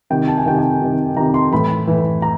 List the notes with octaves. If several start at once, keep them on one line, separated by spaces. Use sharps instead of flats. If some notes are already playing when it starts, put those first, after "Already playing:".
C3 D#3 G5
A5
G#5
C3 D#3 G5
G#5
C3 D#3
C3 D#3 A#5
C6
A2 E3 B5
A2 E3
A#5